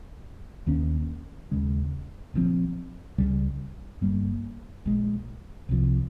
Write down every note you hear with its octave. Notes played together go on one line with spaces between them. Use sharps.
D#2 D#3 A#3 C#4
D#2 C#3 G#3
A#1 A#2 F3 C4
C#2 C#3 G3
G1 G2 G3 A#3
A#1 A#2 G#3
C2 C3 F3